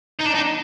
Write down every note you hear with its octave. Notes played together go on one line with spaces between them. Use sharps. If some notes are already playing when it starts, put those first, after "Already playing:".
D#4
D4
D#4